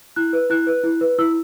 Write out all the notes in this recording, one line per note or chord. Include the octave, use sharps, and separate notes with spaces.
E4 F#6
B4
E4 F#6
B4
E4
B4
E4 E6